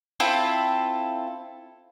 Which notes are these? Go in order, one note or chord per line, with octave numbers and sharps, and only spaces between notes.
C4 E4 F4 A4